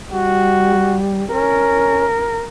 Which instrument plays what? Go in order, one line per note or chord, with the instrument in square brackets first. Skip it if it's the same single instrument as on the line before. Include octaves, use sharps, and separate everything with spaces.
[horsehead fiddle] G3 [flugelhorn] F#4
[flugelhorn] C#4 [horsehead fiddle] A#4